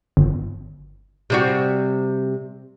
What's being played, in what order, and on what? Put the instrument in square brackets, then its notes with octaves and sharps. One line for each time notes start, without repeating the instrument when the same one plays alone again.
[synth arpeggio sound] G1
[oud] C3 G3 F#4